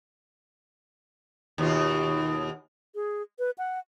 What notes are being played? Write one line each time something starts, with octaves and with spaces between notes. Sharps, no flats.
D#2 B2 F4
G#4
B4
F#5